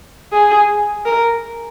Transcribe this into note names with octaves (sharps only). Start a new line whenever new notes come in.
G#4
A#4